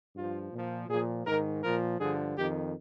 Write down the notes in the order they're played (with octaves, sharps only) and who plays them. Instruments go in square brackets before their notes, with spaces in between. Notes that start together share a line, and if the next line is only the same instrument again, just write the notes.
[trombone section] G2 F3 F4
A#2 F3
A#2 F3 G#4
G#2 D#3 A#4
A#2 F3 A#4
G2 D3 F3 G#4
F2 D#3 G4